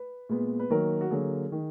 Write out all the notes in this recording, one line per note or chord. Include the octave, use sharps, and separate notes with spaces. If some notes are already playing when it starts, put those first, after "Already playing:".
Already playing: B4
A#2 G#3 B3
B4
D#3 F#3 A#3 A#4
F#4
D3 F#3 A#3 G#4
D#3